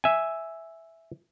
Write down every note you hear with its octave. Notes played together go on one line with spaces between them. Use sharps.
E5 G#5